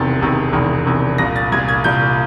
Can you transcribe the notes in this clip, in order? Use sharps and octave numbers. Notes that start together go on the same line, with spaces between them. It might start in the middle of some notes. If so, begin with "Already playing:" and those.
Already playing: E1 E2 C3 D#3 A6
E1 E2 C3 D#3
E1 E2 C3 D#3
E1 E2 C3 D#3
C2 A#2 A#6
A6
C2 A#2 G#6
G#6
C2 A#2 G6